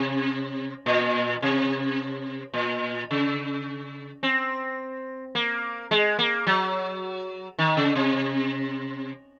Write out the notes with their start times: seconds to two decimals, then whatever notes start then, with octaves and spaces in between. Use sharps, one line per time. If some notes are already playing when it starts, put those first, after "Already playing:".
Already playing: C3
0.86 A#2
1.42 C3
2.54 A#2
3.11 C#3
4.23 C4
5.35 A#3
5.91 G#3
6.19 A#3
6.47 F#3
7.59 D#3
7.77 C#3
7.95 C3